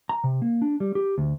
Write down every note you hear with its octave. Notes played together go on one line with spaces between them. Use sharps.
A#5
C3
A#3
D4
G3
G4
D2